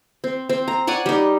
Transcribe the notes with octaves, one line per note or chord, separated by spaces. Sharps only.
C4
C4
A#5
C#5 D5 F#5 G#5
G3 D#4